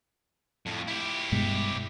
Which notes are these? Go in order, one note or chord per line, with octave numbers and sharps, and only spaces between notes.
F2 A2
E4 G4
G2 B2 G#3